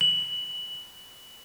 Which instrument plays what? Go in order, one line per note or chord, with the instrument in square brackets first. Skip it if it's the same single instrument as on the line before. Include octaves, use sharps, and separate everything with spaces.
[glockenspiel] F#7